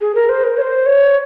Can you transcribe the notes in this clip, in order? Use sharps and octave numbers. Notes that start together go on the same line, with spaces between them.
G#4
A#4
C5
A#4
C#5
C5
C#5